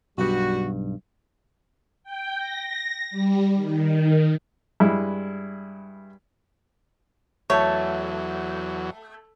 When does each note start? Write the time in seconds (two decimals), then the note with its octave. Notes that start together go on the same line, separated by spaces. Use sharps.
0.18 B1 G2 G3 F#4
2.04 G5
2.38 A#6
3.11 G3
3.54 D#3
4.80 G2 G#3 E4
7.50 E2 F#3 A3 C#5